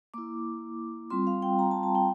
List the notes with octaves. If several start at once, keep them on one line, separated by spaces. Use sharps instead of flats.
A#3 E4 D6
G3 C4 F4 C6
F5
G5
A#5
A5
A5
G5